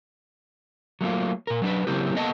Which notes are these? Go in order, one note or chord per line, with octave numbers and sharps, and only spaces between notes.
F#3 A3 A#3 F4
A#2 A#4
F#3 D4 B4
C#3 F#3 A#3 C4 E4 G4
A#3 B3 A4 D#5 F#5 A5